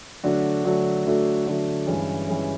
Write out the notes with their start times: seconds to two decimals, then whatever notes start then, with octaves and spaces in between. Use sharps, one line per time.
0.23 D3 F#3 A3 D4 F#4
0.64 D3 F#3 A3 D4 F#4
1.06 D3 F#3 A3 D4 F#4
1.47 D3 F#3 A3 D4 F#4
1.87 G2 E3 G#3 C#4
2.28 E3 G#3 C#4